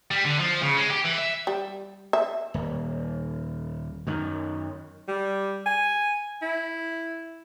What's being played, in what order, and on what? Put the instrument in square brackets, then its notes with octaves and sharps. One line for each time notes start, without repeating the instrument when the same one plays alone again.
[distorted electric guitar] G3
D3
F3
C#3
G#3
G4
E3
E5
[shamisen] G3
E5
[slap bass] D#1
F#2 D#3
[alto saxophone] G3
G#5
E4